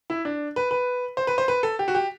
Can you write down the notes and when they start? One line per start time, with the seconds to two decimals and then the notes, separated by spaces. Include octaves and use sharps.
0.10 E4
0.25 D4
0.56 B4
0.71 B4
1.17 C5
1.27 B4
1.38 C5
1.48 B4
1.63 A4
1.79 G4
1.88 F#4
1.95 G4